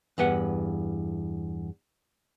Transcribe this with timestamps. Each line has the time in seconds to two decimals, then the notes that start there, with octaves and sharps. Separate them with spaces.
0.18 E2 G2 B4 F#5